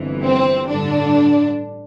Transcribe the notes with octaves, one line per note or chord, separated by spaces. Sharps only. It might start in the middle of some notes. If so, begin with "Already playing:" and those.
Already playing: G1 F2 E3
C4
A1 G2 D3 D4